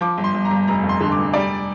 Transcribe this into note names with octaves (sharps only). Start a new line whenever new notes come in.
F3 D6
G1
C6
G1
A#5
G1
F1 A#5
F2
C6
D3 C6
D6
F1
G3 D5